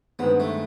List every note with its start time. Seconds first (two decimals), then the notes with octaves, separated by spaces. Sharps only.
0.19 G2 D#3 G#3 B3 C4
0.40 A3